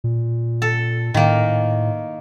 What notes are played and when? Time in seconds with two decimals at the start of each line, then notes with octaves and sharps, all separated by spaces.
0.04 A#2
0.62 A4
1.14 A2 D#3 A#3